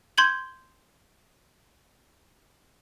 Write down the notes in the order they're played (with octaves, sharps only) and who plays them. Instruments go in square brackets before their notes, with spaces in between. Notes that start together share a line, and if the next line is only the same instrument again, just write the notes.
[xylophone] C6 G6 G#6 F#7